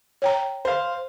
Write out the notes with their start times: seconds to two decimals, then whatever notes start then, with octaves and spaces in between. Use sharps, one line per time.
0.22 C#5 G5 A#5
0.65 C5 F5